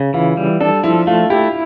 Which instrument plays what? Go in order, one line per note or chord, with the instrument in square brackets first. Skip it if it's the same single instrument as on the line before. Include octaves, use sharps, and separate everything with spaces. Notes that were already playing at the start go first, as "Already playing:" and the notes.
Already playing: [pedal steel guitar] C#3
[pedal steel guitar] E3 [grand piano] F4
[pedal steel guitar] G3
[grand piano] D4 [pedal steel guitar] A4
[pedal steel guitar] F3 [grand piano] E4
[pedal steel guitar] A3 [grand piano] F4
[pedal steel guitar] E4 [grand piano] G4